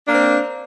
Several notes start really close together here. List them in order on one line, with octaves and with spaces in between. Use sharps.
D4 A#3 C4